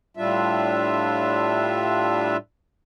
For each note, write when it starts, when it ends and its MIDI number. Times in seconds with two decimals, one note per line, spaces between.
0.17 2.37 45
0.17 2.37 55
0.17 2.37 62
0.17 2.37 65
0.17 2.37 76